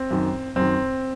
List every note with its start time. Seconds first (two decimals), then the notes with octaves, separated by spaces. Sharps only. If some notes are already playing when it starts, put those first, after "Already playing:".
Already playing: C4
0.11 F#2 D#3
0.56 F#2 C4
0.62 D#3